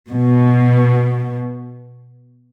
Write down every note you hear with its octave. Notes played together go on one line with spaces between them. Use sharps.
B2